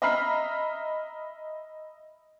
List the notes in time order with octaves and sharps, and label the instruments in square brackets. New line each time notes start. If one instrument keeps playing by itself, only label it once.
[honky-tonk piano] D#5 E5 A#5 B5 F6 C7